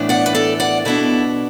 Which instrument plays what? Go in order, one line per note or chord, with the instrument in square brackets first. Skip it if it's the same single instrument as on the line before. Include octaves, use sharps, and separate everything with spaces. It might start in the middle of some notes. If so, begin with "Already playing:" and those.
Already playing: [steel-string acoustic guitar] A2 E3 B3 D4
D5 F#5
B4
A4 D5
D5 F#5
B2 B3 D4 E4 A4